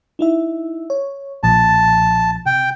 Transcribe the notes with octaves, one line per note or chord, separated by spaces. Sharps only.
D#4 E4 E5
C#5
B1 A#2 F3 A5
C3 G5